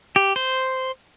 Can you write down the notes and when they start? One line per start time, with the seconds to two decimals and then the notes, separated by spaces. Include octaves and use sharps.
0.16 G4
0.36 C5